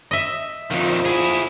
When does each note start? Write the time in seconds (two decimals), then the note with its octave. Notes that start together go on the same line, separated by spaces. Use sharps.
0.11 D#5 E5
0.71 F2 D3 D#3 F3
1.05 E4 G#4